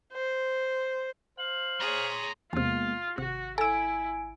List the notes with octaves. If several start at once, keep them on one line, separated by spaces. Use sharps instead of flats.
C5
C5 F5 F#7
G#4 C#5 A#5 C6
E2 C3 G#3 A#3 B3 F4
G#1 C3 F#4
E4 A4 G#5 E6 D7